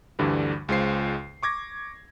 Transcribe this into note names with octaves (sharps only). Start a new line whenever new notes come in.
D2 G2 D3 E3 G3
C#2 G#3 F4 C5 C7
C#6 D6 G#6 A#6